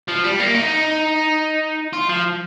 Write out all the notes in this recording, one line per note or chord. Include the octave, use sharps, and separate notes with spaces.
F3
G3
A#3
D#4
F4
F3